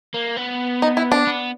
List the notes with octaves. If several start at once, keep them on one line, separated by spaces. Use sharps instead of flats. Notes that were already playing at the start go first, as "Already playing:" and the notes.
A#3
B3
D#4
E4
D4
B3